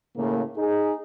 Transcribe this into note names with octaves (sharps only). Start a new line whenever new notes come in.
A2 C#3 A#3
D#4 G#4